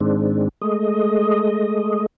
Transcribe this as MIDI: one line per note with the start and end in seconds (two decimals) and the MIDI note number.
0.01 0.48 44
0.01 0.48 51
0.01 0.48 56
0.01 0.48 60
0.01 0.48 62
0.61 2.06 56
0.61 2.06 57
0.61 2.06 75